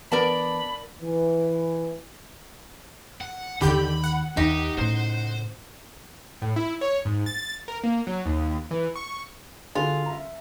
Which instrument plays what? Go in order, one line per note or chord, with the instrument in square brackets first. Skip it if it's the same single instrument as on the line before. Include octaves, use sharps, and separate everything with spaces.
[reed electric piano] E3 B3 D4 [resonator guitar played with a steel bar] A#4 D5 A5 [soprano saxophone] B5
[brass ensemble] E3
[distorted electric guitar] F#5
[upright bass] D#2 D#3 [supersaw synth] D3 G4 G6 [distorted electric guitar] B5
[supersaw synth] F#5
[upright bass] D#2 [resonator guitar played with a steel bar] D#4 [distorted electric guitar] G4
[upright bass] A2 C#3 [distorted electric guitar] C5
[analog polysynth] A2
E4
C#5
G#2
A6
A#4
A#3
F#3
D#2
E3
C#6
[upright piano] D3 F#4 G#4 [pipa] F4
[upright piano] E5 A#5